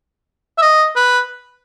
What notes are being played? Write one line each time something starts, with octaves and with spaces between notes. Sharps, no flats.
E5
D#5
B4